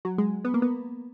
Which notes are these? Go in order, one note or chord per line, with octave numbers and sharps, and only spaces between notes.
F#3
G#3
B3
A#3
B3